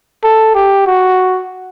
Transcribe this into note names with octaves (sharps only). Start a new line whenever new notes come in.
A4
G4
F#4